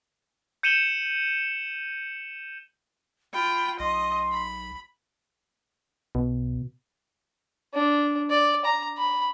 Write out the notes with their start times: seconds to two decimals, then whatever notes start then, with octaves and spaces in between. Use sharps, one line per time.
0.63 G6 C#7 D#7 E7 F#7 G7
3.34 F4 G5 B5
3.79 B1 D#5 C6
4.32 B5
6.15 B1 B2
7.74 D4
8.30 D5
8.65 A#5
8.97 B5